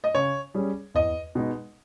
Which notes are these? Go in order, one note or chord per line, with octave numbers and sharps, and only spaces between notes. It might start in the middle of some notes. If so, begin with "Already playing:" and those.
D#5
C#3 C#5
G3 C#4 G#4
E2 D#5
B2 G#3 D#4